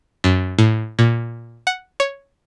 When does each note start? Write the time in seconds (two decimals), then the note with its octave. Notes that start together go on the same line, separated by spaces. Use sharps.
0.24 F#2
0.58 A2
0.99 A#2
1.67 F#5
2.00 C#5